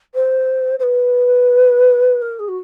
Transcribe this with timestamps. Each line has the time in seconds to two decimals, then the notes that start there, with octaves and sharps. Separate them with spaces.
0.15 C5
0.79 C5
0.83 B4
2.22 A#4
2.39 G#4
2.48 F#4